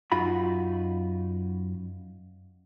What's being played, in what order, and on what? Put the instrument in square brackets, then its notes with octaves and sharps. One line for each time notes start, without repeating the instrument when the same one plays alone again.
[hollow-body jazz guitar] F#2 D#4 F4 F#4 B5